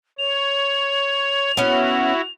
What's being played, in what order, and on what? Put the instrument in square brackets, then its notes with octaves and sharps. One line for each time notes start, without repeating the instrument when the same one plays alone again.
[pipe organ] C#5 [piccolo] F7
[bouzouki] B3 C#4 [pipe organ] E4 F#4